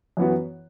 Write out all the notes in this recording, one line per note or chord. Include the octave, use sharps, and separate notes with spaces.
F#2 E3 B3 F#4